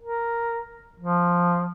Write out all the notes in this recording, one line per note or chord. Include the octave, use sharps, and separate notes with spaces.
A#4
F3